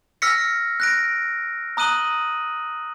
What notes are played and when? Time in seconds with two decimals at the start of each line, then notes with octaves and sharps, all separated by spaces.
0.22 E6 F6 A#6 B6 C#7
0.80 F#6 A#6 D7
1.77 A#5 D#6 F#6 D#7 F#7 G7